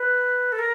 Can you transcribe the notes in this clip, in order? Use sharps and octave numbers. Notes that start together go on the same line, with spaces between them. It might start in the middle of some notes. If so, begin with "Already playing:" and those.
Already playing: B4
A4
A#4